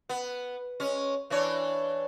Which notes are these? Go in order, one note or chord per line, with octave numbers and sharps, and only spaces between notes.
B3
G#3 C#4
E3 D4 C#5